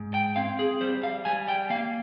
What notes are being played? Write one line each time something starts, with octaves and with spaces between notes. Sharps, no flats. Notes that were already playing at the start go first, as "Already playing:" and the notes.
Already playing: G#2
G5
C4 F5
G#4
G3 C5
F5
G3 G#5
G5
A#3 F5